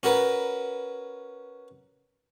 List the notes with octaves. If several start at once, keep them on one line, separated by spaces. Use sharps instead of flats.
C#4 F#4 A#4 B4